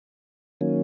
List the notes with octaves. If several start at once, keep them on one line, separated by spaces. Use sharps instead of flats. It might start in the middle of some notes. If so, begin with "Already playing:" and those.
D#3 F#3 A#3 C#4